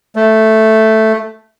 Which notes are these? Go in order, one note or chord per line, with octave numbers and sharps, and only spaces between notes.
A3